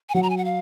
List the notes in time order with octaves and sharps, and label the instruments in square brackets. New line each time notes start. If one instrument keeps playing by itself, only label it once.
[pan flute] G#5
[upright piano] F#3 [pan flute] F#5
[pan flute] A#5
G#5
F#5
F5